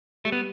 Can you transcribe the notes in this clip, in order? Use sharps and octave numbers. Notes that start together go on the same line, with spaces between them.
G3 A3
B3